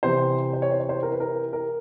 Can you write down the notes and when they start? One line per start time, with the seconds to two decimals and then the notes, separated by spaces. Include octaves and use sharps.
0.03 C3 E3 C5
0.53 C5
0.62 C#5
0.71 C5
0.80 C#5
0.89 C5
1.03 A#4
1.12 B4
1.20 A#4
1.53 A#4